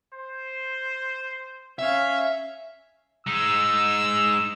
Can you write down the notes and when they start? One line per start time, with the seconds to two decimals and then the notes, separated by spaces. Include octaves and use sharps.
0.13 C5
1.79 C#4 E5 F5
3.27 G#3 D#4 E6